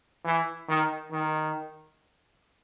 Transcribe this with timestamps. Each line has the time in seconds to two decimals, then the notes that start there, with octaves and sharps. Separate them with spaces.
0.24 E3
0.69 D#3
1.12 D#3